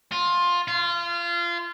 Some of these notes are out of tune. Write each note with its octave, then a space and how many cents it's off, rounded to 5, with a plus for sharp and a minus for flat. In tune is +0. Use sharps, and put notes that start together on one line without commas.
F4 +15
F4 -25